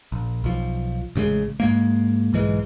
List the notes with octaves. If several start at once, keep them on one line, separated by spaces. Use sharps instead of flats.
A#1
B1 F3
A1 C#3 F3 G#3
G#2 G#3 A#3
B1 G#2 E3 G#3